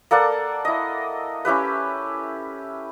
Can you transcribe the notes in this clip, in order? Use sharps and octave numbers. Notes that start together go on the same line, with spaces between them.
A#3 A4 D5 F#5
E4 D#5
C#4 E4 G4 B4